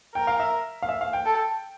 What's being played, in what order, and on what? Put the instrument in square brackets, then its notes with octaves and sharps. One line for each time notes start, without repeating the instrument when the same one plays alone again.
[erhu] A#4 [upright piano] G5
[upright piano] F5
E5
F5
E5
F5
G5
[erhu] A4